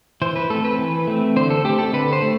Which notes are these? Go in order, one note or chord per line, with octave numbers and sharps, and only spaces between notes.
E3 C5
B4
A3 C4 A4
B4
E3
A3 C4
D3 C5
A4
A3 C4 G4
A4
D3 B4
C5
A3